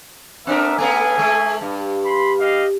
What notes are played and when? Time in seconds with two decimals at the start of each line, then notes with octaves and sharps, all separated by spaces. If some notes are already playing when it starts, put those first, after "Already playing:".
0.47 A3 B3 C4 D4 A#4 E5
0.78 A3 B3 C#4 G#4 A4 G#5
1.18 G#3 A3
1.61 G2
2.05 B5 C6
2.39 G4 D#5 F5